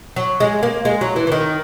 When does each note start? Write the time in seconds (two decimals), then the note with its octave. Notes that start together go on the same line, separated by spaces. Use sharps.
0.16 F#3
0.40 G#3
0.63 A#3
0.85 G#3
1.01 F#3
1.16 E3
1.27 E3
1.32 D#3